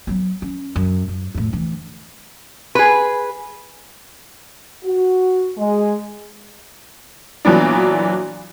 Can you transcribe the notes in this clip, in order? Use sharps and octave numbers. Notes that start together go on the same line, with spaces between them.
F#3 B3
C#4
F#2
F#2
F2 A2
D2 E3
G#4 B4
F#4
G#3
A#2 E3 F#3 B3 D4